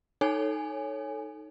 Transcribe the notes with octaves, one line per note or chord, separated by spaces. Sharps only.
D#4 A4 C#5 G#5